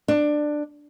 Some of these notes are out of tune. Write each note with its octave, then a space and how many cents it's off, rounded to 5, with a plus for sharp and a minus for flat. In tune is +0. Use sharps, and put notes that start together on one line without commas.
D4 +15